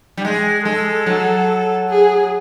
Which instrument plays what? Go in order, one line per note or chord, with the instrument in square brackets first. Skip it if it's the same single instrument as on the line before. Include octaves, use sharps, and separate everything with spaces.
[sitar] G3
[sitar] G#3 [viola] G#4
[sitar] G#3 [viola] A4
[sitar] F#3
[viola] G#4